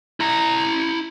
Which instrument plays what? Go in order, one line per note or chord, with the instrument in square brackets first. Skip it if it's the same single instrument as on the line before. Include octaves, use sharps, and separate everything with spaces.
[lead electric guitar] E4 A#5